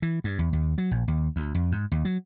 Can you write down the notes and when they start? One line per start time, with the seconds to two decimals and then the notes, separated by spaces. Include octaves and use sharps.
0.02 E3
0.24 G2
0.39 E2
0.53 D#2
0.78 F#3
0.91 A#1
1.08 D#2
1.36 D2
1.55 F2
1.72 G#2
1.92 D#2
2.05 F#3